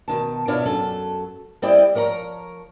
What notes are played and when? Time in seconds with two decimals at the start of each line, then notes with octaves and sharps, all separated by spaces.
0.08 B2 D#3 A5
0.48 B2 D4 E4 F4 C#5 F5
0.66 F#2 F#3 A4
1.62 G3 C4 E4 D5 D#5 G5
1.95 F3 A#4 C#5 D#5 A#5